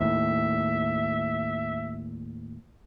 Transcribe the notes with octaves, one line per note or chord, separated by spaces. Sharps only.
D#2 A2 E5